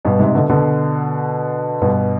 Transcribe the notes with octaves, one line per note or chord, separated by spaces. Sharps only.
G2 B2
G#2 C3
B2 D3
B2 D3
G2 B2